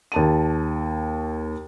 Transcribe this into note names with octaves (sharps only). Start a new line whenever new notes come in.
D#2 A5 D#7